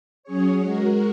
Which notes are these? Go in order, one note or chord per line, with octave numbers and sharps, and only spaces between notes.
F#3 C#4 G#4 C#5
G#3 F#4 A#4